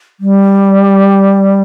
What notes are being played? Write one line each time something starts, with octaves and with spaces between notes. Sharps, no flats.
G3